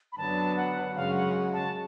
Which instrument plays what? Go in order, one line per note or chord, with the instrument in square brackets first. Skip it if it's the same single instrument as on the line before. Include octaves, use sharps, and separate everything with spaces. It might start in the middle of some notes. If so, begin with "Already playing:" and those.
[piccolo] B5
[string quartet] F#2 D3 F#3 B3 D4 [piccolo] A5
[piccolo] F#5
[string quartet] F#2 C#3 G#3 C#4 F#4 [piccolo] F5
[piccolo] F#5
A5